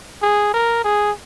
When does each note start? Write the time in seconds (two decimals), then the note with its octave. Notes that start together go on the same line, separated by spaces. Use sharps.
0.22 G#4
0.54 A#4
0.84 G#4